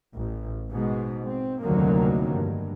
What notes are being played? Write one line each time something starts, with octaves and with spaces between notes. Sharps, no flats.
A1
G#2 B2 G#3
C4
F1 D2 D3 D#3 F#3 A#3
G2